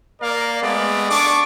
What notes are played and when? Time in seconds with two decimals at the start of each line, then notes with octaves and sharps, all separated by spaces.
0.21 A#3 A#4 D5 F5
0.62 G#3 A3 B3 D5
1.09 D4 C#6 D6